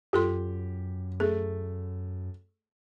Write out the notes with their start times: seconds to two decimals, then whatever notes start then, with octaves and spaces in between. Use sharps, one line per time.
0.13 F#2 F4 G4 A4 C6
1.20 A3 G#4